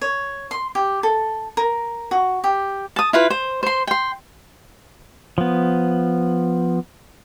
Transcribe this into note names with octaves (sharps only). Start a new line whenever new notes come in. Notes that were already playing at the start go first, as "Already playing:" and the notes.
C#5
C6
G4
A4
A#4
F#4
G4
A5 D#6
E4 F4 B4
C5
C5 C6
G5 C6
F3 B3